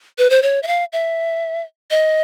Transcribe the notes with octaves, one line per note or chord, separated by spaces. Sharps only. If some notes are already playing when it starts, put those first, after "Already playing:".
B4
C5
C#5
E5
F5
E5
D#5